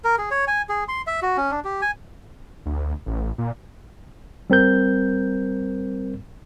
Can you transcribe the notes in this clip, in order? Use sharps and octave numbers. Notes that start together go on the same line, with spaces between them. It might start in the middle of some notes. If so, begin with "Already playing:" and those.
A#4
G#4
C#5
G#5
G#4
C6
E5
F#4
C#4
D4
G4
G#5
D2
A1
A#2
G3 C4 A#4 G6